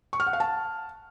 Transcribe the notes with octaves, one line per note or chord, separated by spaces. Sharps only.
C#6
F6
F#5
F5
A5